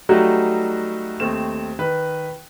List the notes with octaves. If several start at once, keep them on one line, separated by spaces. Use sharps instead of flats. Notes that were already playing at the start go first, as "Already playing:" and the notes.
F#3 G3 A3 D#4 F#4
D#2 A3 C4 E7
D#3 B4